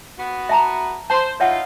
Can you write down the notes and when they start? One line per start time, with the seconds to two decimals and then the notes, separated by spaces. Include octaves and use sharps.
0.18 B3 F#4
0.49 E5 A5 A#5
1.10 C5 A5 C6
1.40 E3 D#4 F4 C#5 E5 F#5